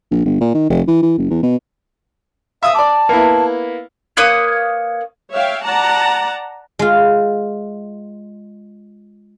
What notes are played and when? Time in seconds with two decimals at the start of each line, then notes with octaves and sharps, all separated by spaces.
0.11 A#1
0.25 G1
0.41 A#2
0.54 D#3
0.70 F1
0.88 E3
1.02 E3
1.18 F#1
1.30 E2
1.43 B2
2.63 E5 F5 D#6 E6
2.75 D5 A5 D6
3.09 A#3 B3 E4
4.17 A#3 B4 C#5 D#6
5.32 C#5 E5 F5 G5
5.63 D5 F#5 A5 A#5
6.79 G#3 F4